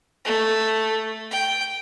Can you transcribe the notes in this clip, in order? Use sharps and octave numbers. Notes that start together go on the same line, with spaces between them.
A3
G5